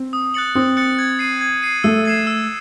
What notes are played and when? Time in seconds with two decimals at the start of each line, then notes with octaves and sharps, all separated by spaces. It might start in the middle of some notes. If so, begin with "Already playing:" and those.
Already playing: C4
0.13 D#6
0.34 F#6 A6 C#7 F#7
0.55 C4 D#6
0.77 F#6 A6 C#7 F#7
0.98 G#6
1.19 C7 D#7
1.41 G#6
1.63 C7 D#7
1.84 A3 E6
2.05 G#6 C7 E7
2.27 E6